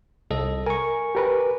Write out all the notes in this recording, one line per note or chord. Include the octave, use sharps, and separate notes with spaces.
C2 A4 D#5
A#4 G#5 C#6
G4 A#4 B4